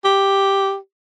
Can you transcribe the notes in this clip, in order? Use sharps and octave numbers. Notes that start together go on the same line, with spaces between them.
G4